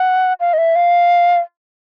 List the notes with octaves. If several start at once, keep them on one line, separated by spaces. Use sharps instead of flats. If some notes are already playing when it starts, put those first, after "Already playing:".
Already playing: F#5
F5
D#5
E5
F5